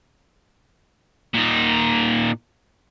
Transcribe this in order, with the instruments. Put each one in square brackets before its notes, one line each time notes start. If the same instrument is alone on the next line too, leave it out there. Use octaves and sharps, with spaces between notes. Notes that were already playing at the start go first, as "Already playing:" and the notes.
[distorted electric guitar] A#2 D#4